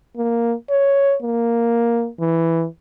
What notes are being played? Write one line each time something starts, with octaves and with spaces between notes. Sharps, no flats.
A#3
C#5
A#3
E3